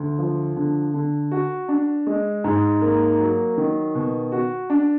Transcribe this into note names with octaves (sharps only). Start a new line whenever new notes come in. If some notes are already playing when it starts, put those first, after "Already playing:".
Already playing: D2
F3
D3
D3
F#4
D4
G#3
G#2
A#3
F#3
D#3
B2
F#4
D4